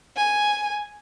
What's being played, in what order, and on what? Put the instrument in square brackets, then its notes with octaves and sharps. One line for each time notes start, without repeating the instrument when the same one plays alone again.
[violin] G#5